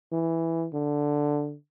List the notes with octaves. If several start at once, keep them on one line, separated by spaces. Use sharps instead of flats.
E3
D3